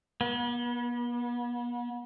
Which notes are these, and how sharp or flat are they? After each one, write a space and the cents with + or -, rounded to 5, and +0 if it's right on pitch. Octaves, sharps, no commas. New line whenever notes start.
B3 -40